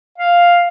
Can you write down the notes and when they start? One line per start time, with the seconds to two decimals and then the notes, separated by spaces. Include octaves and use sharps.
0.18 F5